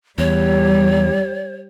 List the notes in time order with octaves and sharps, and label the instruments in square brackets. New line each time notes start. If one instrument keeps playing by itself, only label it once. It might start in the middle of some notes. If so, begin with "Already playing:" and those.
[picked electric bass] E2 [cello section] G3 [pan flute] C#5